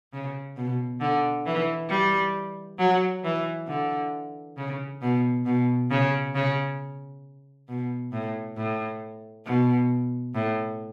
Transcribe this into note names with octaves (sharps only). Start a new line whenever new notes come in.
C#3
B2
D3
E3
G3
F#3
E3
D3
C#3
B2
B2
C#3
C#3
B2
A2
A2
B2
A2